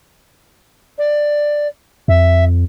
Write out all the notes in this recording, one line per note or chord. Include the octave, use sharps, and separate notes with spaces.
D5
F2 E5